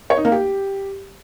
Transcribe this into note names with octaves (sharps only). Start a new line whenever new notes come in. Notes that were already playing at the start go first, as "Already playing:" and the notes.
C#5
D#4
A#3
G4